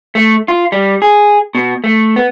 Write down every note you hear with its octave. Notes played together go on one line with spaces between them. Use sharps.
A3
F4
G3
G#4
B2
A3
B3